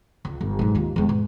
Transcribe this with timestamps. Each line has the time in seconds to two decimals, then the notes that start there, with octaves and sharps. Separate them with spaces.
0.25 C#2
0.41 G1
0.59 G#2 F#3
0.75 D#2 F4
0.96 E2 G#3
1.09 G#2